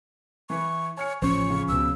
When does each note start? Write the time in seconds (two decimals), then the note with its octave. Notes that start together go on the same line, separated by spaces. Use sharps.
0.50 E3 B4 C#6
0.97 C#5 G#5 F6 C#7
1.22 A1 F3 C#4 C5 C#6
1.50 C#3
1.69 C#2 B2 E6